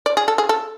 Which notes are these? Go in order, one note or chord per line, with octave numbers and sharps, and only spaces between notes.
D5
G#4
A4
G#4
A4